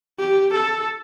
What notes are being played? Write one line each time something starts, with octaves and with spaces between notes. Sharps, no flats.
G4
A4